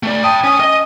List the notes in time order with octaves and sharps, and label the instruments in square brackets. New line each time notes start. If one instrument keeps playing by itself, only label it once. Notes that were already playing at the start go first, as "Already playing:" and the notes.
[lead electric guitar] A3 D5
[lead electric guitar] G5 A5 [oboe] D#6
[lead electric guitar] C#4 [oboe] D#6
[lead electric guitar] D#5